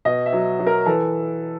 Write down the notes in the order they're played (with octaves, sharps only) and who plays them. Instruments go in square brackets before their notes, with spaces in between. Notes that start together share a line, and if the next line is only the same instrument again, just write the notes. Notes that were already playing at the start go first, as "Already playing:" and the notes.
[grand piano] B2 D#5
E5
F#3
F#3
A#4
E3 A4